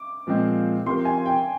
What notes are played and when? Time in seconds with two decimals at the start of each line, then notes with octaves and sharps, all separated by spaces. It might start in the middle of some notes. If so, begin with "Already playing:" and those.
Already playing: D6
0.27 A#2 F3 G#3 C4
0.86 F3 C4 G4 A#4 C6
1.05 G#5
1.26 G5